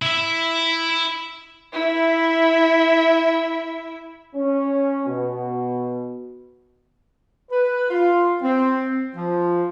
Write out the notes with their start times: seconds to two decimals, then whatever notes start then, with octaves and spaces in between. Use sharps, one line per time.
0.02 E4 E5
1.73 E4 E5
4.35 C#4
5.07 B2
7.50 B4
7.91 F4
8.42 C4
9.15 F3